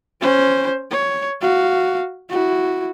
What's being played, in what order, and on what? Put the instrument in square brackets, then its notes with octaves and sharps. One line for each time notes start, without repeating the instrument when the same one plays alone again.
[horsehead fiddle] C#4 C5
C#5
F#4 F5
E4 F#4